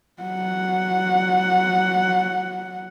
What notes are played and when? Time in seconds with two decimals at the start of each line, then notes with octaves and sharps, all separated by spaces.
0.22 F#3 F#5